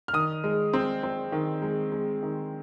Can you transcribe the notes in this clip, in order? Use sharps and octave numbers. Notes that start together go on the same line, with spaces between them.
F6
D#3 D#6
G#3
C4
C4
D#3
G#3
G#3
D#3